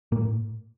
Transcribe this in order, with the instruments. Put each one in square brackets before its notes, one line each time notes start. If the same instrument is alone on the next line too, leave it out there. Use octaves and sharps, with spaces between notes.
[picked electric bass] A2 A#3